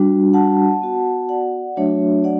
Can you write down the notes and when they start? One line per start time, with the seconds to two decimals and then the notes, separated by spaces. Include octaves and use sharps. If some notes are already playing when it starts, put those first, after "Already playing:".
Already playing: G3 D4 F#4
0.34 F#5 A5
0.82 B3 F#4
1.29 D5 F#5
1.76 F#3 A3 D4 F#4 C#5 E5
2.24 D5 F#5